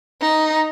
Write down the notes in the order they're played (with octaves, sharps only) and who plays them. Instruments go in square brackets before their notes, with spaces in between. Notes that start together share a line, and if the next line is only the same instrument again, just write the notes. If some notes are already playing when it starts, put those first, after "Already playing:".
[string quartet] D#4